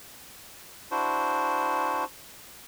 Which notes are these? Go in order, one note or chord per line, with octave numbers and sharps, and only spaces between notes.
D4 E4 F#4 C5